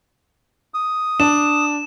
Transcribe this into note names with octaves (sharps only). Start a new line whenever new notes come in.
D#6
D4 E7